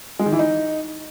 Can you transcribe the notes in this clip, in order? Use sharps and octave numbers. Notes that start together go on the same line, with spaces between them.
G#3
D#3
E3
D#4